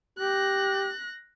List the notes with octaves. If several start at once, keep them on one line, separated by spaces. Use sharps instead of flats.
G4 F#6 A#6